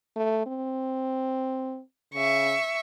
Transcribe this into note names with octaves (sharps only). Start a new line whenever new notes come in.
A3
C4
C#3 E5 C#6